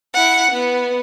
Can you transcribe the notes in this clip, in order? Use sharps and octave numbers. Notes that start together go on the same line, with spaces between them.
E4 F#5
B3